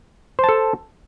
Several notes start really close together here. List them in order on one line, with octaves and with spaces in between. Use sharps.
C5 A5 A4